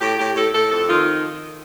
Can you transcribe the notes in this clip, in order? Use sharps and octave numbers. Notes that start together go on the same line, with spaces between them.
A2 G4
A2 G4
A2 A4
A2 A4
F2 A4
D#3 F4